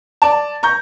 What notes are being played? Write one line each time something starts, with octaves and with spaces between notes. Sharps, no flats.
D5 A5
A#5 C#6 G6